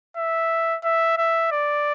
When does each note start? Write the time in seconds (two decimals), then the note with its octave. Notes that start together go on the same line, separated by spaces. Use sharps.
0.17 E5
0.84 E5
1.18 E5
1.51 D5